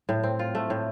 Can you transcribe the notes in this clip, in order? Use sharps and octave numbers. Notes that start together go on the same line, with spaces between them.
A2
C4
F4
A3
A2